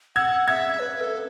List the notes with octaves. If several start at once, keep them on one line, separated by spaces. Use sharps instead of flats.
F#5 E6 G#6
E5 E6 G#6
B4
A4